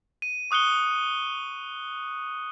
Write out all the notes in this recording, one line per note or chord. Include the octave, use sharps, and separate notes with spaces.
D#7
C#6 D#6 F#6 C#7 G7